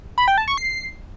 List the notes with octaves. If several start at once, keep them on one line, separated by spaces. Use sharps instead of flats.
B5
G5
A5
C#6
C7